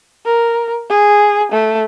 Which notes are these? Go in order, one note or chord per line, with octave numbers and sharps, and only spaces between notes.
A#4
G#4
A3